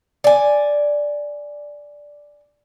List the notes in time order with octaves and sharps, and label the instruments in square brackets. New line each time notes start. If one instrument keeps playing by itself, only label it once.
[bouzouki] D5 G#5